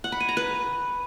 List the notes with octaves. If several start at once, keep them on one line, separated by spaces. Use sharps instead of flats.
F#5
B5
G#5
A#5
B4